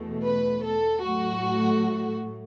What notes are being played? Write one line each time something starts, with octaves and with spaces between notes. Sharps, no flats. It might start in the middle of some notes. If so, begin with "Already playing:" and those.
Already playing: E2 B2 A3
B4
A4
A2 F#3 A3 F#4